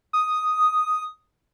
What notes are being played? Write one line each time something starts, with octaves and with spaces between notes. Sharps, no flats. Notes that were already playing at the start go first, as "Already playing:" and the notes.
D#6